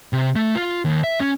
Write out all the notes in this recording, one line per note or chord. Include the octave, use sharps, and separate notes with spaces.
C3
A3
F4
D#2
E5
C#4